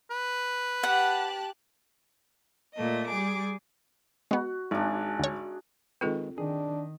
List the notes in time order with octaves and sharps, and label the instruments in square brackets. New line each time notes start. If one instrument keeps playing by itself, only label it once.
[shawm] B4
[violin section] G4 A5 F#6 [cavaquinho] F#5
[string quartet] A#2 A3 D#5
G3 G#4 D6
[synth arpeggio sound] G#3 B3 [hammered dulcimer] F#4
[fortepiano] G#1 [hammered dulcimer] D4 G#4
[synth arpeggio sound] D2 C#5
[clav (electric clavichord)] D#3 G#3 B4 [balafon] C4 F4 A4
[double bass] D#3 [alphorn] D4 [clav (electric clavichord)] G#4